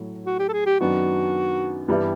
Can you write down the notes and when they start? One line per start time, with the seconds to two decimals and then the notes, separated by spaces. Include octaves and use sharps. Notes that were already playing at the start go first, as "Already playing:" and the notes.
Already playing: A2 F#3 A3
0.26 F#4
0.39 G4
0.49 A4
0.53 G#4
0.66 G4
0.79 F#2 D#3 F#3 B3 D4 F#4
1.88 G2 E3 G3 B3 E4